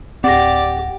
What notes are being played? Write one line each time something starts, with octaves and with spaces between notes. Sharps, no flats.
D1 C4 G4 D5 F#5 A#6